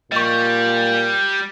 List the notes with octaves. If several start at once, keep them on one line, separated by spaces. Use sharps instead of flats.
A#2 G3 D#5 C#6